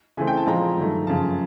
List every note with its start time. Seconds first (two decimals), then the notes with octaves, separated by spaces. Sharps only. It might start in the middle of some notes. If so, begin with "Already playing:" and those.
0.17 C#3 E3 A3 C4 G#5
0.27 G5
0.37 A5
0.46 A#2 F3 G#3 C4 A#5
0.77 G2 D#3 F#3 A3
1.07 F#2 C#3 F3 A5